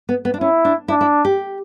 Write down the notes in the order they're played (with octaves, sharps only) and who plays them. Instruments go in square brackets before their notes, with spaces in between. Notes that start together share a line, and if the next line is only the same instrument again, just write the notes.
[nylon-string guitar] B3
B3
D4
[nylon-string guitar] C#4 [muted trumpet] E4
[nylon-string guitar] D4
[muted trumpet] D4 [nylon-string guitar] E4
[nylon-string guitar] E4
G4